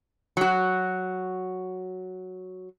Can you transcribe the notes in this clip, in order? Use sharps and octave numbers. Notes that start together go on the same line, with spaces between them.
F#3 F#4